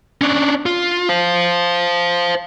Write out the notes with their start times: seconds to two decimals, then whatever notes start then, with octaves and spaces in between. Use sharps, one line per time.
0.21 C#4 D4
0.66 F4
1.09 C5 F5